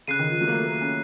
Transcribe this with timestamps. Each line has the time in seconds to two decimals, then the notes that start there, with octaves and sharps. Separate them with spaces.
0.08 C#3 F#6 C7 D#7
0.19 D#3
0.30 F3
0.41 F#3
0.47 A#3
0.51 A3
0.66 A#3
0.81 C#4